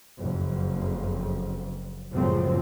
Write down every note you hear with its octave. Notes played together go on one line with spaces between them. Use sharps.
F#1 F2
C#2 F#2 A2 C#3 F3 C4